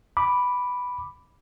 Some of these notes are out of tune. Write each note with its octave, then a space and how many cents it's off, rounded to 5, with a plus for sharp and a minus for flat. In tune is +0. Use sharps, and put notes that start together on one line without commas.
B5 +0 D6 +0